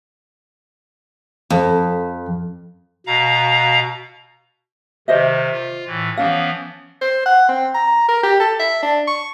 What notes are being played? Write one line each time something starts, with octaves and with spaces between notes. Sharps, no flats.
F2
B2 F5 A#5
C3 D#3 C5 D#5 E5
F4
A2 E3
E3 F3 B3 C#4 F5
C5
F#5
C4
A#5
A#4
G4
A4
E5
D4
C#6